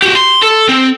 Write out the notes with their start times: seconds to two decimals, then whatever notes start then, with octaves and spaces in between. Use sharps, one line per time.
0.02 F#4 G4
0.15 C6
0.43 A4
0.69 C4